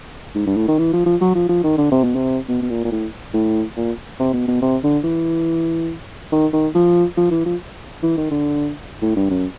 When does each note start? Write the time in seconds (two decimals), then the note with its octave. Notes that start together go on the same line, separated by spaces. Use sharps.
0.35 G#2
0.46 G2
0.56 A2
0.68 D#3
0.78 E3
0.93 F3
1.06 F3
1.21 F#3
1.35 F3
1.49 F3
1.63 D#3
1.78 D3
1.92 C3
2.04 B2
2.15 C3
2.48 B2
2.62 B2
2.70 A#2
2.85 A#2
2.91 A2
3.33 A2
3.76 A#2
4.20 C3
4.33 B2
4.47 B2
4.62 C3
4.84 D3
5.04 E3
6.32 D#3
6.53 D#3
6.75 F3
7.17 F3
7.31 E3
7.46 F3
8.03 E3
8.17 D#3
8.31 D3
9.02 A2
9.16 G2
9.30 F#2